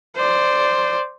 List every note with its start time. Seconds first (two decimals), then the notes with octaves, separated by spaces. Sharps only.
0.16 C5 D5